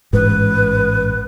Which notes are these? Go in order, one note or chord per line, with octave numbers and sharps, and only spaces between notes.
A1 G#2 B4